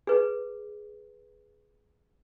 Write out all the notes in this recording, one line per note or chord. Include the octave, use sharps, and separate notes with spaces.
G#4 B4